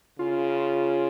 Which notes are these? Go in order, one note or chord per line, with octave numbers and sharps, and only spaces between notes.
C#3 F4